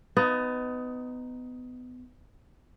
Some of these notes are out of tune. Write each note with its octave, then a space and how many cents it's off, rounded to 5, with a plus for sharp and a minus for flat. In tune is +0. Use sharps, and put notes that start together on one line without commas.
B3 +25 D#4 -5